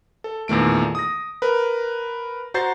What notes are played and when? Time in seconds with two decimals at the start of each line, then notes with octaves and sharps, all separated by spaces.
0.24 A4
0.48 E2 A#2 D#3 A3 D7
0.95 D#6 A#6
1.42 A#4 B4
2.54 F#4 C5 A#5 G6 A6 C7